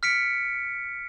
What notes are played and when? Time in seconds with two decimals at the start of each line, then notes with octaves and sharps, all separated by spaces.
0.03 F6 B6 C#7 D7